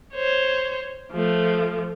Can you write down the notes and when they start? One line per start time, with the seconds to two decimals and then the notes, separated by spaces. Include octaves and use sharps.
0.14 C5 C#5
1.12 F3 A3